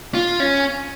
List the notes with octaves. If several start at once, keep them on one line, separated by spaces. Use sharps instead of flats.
F4
C#4